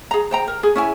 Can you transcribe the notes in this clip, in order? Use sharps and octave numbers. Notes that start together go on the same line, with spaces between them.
G#4 A#5
C5 G5 A#5
A#4
G#4
C#4 E4 G#5